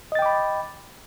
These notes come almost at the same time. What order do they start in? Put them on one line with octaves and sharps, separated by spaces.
D#5 A6 G5 D6 B5